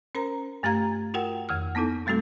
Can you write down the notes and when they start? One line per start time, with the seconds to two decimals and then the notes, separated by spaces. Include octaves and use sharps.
0.15 C#4 A#4 C5 A#5
0.63 G2 A3 G4 F5 A#5 G#6
1.14 F4 F#4 A#4 F#5 G5
1.49 F2 D#3 F6
1.75 A#3 B3 D#4 E4 A4
2.06 B2 G3 A3 C4 F#4 A4